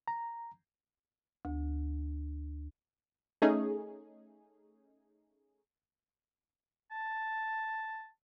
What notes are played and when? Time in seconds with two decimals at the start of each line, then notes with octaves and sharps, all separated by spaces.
0.08 A#5
1.45 D2
3.42 A3 C#4 D#4 G#4
6.91 A5